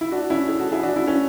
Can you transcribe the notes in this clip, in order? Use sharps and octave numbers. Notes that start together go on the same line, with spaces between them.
E4
D4 F#4
C#4 E4
E4 G#4
F#4 A4
E4 G#4
D4 F#4
C#4 E4
C#4 E4